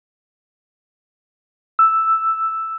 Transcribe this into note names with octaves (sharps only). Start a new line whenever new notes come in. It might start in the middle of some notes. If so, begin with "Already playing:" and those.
E6